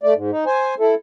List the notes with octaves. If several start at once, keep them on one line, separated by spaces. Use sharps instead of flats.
A3 D5
G#2
D#4
C5 G#5
E4 A4